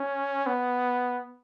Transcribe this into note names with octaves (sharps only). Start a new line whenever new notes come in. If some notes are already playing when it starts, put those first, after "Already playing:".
Already playing: C#4
B3